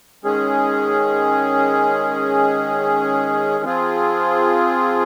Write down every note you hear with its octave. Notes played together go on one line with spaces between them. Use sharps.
D#3 G#3 C#4 G#4
F3 C4 F4 G#4